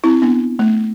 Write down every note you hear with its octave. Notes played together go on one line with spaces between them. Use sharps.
C4 E4
B3 D4
A3